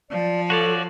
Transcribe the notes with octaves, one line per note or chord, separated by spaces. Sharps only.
F3 D5
F#4 A4 C#5 D5